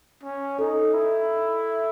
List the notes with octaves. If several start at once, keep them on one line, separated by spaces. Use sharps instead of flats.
C#4
D#4 A4
E4